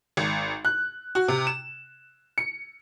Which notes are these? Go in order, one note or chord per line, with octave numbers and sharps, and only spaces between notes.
G#1
F#6
F#4
C3
E7
C#7